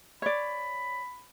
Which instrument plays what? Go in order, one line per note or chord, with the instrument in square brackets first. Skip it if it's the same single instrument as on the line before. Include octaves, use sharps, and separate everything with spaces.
[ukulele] C#5 D5 [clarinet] B5